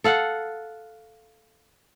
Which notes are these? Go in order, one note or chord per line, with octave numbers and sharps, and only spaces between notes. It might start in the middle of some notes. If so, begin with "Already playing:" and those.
A4 F5 F#5